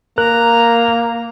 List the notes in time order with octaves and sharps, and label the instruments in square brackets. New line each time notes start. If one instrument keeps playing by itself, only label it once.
[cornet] A#3 [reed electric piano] A#4 F#6 [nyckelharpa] A#5